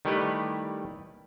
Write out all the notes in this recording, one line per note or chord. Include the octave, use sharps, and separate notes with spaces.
D#3 G3 A3 E4 G4 B4